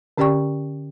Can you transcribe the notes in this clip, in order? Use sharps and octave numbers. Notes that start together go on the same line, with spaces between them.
D3 C#4 G4 D5 G5 C#6